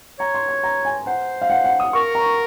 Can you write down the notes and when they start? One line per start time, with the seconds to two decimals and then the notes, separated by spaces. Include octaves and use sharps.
0.19 C#5 A#5
0.35 C6
0.49 C6
0.64 A#5
0.85 G#5
1.06 C5 F#5
1.42 F5
1.50 F#5
1.64 F#5
1.80 D#6
1.93 A#4 C#6
2.15 A#5